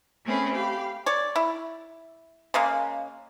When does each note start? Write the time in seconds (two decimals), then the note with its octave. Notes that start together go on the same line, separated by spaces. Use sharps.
0.24 A3 C4 C#4 G#4 B4
0.54 G4 F5 B5
1.06 C#5 D5
1.36 E4
2.54 C#3 G#3 A#3